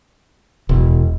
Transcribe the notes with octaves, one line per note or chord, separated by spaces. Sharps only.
E1